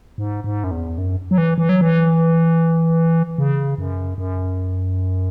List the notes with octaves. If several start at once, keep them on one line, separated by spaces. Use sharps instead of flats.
G#2
G#2
F#2
E2
F#2
F#3
E3
E3
F#3
E3
C#3
F#2
F#2